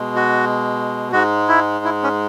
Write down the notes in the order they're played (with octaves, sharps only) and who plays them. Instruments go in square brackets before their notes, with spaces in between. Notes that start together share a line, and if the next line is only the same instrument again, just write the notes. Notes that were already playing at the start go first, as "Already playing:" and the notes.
Already playing: [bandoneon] B2 G#3
F#4
G#2 G#3 F#4
E4
E4
C#4